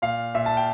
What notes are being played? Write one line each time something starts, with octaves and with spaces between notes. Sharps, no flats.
A#2 F5
A#2 E5
A5
G5